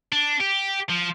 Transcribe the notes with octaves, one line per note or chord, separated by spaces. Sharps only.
D4
G4
F3